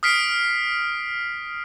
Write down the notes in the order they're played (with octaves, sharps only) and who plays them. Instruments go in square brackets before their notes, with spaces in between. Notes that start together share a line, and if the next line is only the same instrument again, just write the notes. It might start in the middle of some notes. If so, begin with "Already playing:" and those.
[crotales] D#6 F6 B6 C7 D7